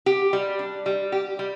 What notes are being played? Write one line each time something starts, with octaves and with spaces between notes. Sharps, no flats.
G4
G3
D4
G3
G4
G3